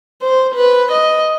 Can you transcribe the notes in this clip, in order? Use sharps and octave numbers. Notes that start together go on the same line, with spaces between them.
C5
B4
D#5